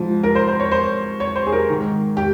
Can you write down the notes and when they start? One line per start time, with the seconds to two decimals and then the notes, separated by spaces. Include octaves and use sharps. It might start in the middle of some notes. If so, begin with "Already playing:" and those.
Already playing: G#2 F3
0.23 A#4
0.35 C5
0.48 C5
0.60 C#5
0.71 C5
1.20 C#5
1.36 C5
1.46 G#4
1.52 A#4
1.69 G#2 D#3
2.17 G4